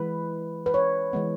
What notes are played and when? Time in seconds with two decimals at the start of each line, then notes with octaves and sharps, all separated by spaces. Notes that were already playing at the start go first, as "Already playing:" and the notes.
Already playing: E3 G#3 B4
0.66 B4
0.74 C#5
1.13 E3 G#3 B3